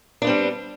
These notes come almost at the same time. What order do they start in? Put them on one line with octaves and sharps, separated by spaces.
D4 B3 C4 G3